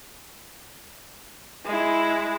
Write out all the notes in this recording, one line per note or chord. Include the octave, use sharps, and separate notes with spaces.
G#3 E4